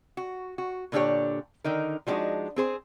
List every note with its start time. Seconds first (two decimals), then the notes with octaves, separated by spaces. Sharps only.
0.17 F#4
0.58 F#4
0.92 A#2 D3 G3 D4 G4 C#5
1.64 D3 D#3 D#4 A#4
2.07 F3 G3 G#3 D4 D#4 F#4
2.56 C4 G#4 C5